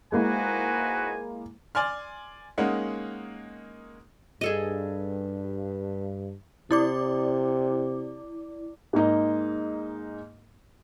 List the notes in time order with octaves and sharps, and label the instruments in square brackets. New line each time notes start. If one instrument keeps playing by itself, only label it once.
[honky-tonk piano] G#3 A#3 E4 [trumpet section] D#4 F#4 B4 [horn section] C5 G#5
[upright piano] D5 G#5 C6 F6
G#3 A#3 C#4 D#4 F#5
[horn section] G2 [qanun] G#4 A4 D#5
[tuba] C3 [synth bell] E4 D5 D6
[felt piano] G#2 A#3 D#4 D#5